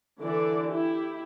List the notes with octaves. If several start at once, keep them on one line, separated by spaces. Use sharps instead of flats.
D3 E3 D5
E4 G4